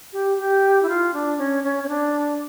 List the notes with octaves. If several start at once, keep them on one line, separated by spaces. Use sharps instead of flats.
G4
G4
E4
F4
D4
C#4
C#4
C#4
D4